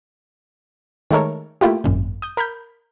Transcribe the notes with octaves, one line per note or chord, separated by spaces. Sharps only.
D#3 G#3 A3 A4 A#4 C#5
A3 A#3 E4 F4 G4
G#1 F#2 A#2
D#6 G6
A#4 B5 F6 G6